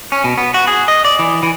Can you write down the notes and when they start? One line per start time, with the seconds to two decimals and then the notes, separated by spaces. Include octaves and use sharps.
0.12 C#4
0.24 B2
0.38 B3
0.54 F#4
0.67 G#4
0.88 D#5
1.05 D5
1.19 E3
1.43 E3